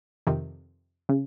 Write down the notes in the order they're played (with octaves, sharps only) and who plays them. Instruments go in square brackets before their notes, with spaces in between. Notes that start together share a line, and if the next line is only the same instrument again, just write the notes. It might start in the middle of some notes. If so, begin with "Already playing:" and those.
[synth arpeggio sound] F2 C3 D#3
[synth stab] C#3